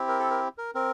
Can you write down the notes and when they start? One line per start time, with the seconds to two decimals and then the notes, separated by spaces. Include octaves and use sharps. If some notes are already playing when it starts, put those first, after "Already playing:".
Already playing: C4 E4 G4
0.08 A#4
0.20 A4
0.30 A#4
0.58 A#4
0.75 C4 A#4